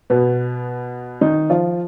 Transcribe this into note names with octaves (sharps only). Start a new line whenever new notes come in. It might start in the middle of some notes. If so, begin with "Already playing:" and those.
B2 B3
D#3 D#4
F3 F4